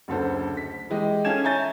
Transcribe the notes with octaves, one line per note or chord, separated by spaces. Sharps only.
F#1 D2 A4 C5
B6
E3 G#3 G4 D#5
C#4 A4 F5 G#5 G#6 E7
C#5 E5 G#5 A#5 G6 A6